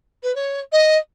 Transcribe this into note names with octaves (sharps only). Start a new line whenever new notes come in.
B4
C#5
D#5